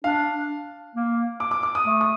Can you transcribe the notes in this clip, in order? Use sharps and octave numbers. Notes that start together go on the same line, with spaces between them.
D4 F5
A#3
D6
D6
D6
D#6
A3
D#6